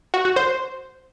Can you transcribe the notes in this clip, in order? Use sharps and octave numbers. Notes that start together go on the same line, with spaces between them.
F#4
F#4
C5